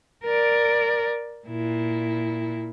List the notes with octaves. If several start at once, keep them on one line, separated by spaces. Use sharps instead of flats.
A#4 D5
A#2 E4